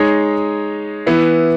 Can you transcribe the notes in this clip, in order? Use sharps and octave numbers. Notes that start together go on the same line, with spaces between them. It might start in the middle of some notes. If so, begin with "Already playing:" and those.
Already playing: G#3 D#4 G#4 C#5
E3 B3 E4